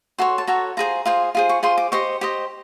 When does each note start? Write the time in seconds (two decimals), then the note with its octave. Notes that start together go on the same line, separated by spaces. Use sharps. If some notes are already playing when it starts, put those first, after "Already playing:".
0.18 F#4 A4 C#5 C6
0.38 A5
0.47 F#4 A4 C#5 A#5
0.77 F4 G#4 C5 A#5
1.05 F4 G#4 C5
1.35 F4 G#4 C5
1.49 C#6
1.63 F4 G#4 C5 C6
1.78 D6
1.92 G4 C5 D#5 C#6
2.21 G4 C5 D#5